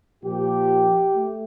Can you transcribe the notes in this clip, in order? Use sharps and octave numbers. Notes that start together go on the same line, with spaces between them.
A#2 F3 G4
A3